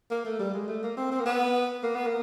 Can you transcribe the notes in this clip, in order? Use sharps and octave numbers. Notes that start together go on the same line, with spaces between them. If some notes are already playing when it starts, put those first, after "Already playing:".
A#3
A3
G3
G#3
A3
A#3
C4
C4
A#3
B3
A#3
B3
A#3